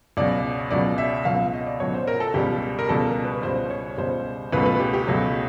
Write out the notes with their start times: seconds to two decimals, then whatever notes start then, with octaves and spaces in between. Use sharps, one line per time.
0.17 C#2 B2 F#3 D5
0.71 C#2 B2 F#3 D5
0.98 E5
1.25 C#2 B2 F#3 F5
1.40 E5
1.53 D#5
1.67 D5
1.80 C#2 B2 F#3 C#5
1.94 C5
2.07 A#4
2.20 A4
2.34 C#2 B2 G3 G4
2.79 A#4
2.89 C#2 B2 G3 A4
3.07 A#4
3.25 B4
3.43 C#2 B2 G3 C5
3.70 C#5
3.98 C#2 B2 G3 C5
4.53 C#2 B2 F#3 A3 B4
4.66 B4
4.80 G4
4.93 G4
5.07 C#2 B2 F#3 A3